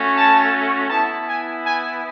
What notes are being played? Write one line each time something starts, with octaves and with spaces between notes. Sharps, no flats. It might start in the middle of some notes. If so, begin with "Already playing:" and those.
Already playing: A3 C#4 F#4
A5
B3 E4 A5
G#5
G#5